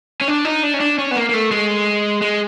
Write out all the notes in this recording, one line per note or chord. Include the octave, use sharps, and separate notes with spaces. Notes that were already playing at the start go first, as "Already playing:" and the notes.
C#4
D4
D#4
D4
C#4
D4
C#4
B3
A#3
A#3
A3
G#3
G#3